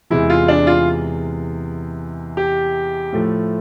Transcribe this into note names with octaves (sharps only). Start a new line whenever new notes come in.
E2 C3 E3 G#3 E4
F4
D4
F4
G4
A2 F3 A3